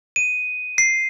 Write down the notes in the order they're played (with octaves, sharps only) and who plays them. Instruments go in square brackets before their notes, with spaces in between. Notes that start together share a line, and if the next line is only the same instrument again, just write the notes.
[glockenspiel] D#7
C7